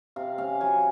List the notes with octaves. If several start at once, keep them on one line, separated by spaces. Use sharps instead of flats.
C3 F5
C#4 F5
F#3 G#5